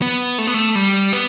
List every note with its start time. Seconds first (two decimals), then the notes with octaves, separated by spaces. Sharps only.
0.02 B3
0.38 A3
0.47 B3
0.54 A3
0.75 G3
1.13 B3